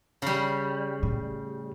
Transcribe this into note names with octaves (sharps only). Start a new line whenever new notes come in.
C#3 G3
A2